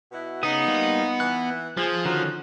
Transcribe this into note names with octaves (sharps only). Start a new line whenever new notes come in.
B2 E4 F#4
C#3 B3 D#4 D#6
G3 A#3 F4
E3 F#6
F3 G#4
D3 D#3 C#4 D#4 F4 F#4